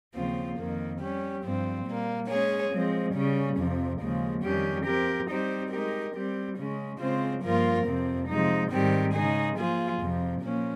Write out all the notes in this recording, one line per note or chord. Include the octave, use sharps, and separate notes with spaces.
D#2 C#3 F3 C4 F4
F2 D#3 A#3
G3 C#4 G4
G2 F3 C4
A#2 G3 A#3
G#3 C#4 G#4 C#5
F3 G#3 C4
C#3 G3 C#4
F2 C3 F3
D#2 C#3 F3 G#3
F2 D#3 G3 C#4 G4
F3 C4 G4 A#4
G3 C4 D#4 G4 C5
G#3 D#4 G4 A#4
G3 C4 G4
C#3 G#3 C#4
C#3 G#3 C4 F4 C5
G2 F3 A#3 F4 A#4
F2 C3 F3 C4
C3 F3 G#3 D#4
G#2 D#3 G3 C4 G4
C#3 G#3 D#4 G#4
F3 A#3 F4 G#4
F2 C3 F3
A#2 F3 A#3 C#4